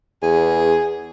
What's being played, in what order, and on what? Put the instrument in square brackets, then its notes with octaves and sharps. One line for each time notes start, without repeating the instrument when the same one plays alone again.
[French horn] E2 [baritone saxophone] G#4